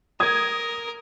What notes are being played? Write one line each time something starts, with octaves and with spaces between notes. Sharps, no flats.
A#4 D#6 G#6